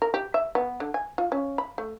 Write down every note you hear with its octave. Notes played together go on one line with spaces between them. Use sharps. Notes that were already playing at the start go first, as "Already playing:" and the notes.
A#4
G4
E5
B3
D3
G#5
F4
C#4
B5
A3